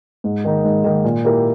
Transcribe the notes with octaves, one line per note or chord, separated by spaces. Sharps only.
G#2
D#3 A#3 D#4
G#2
D#3 A#3 D#4
A#2
A#3 E4 G4 A#4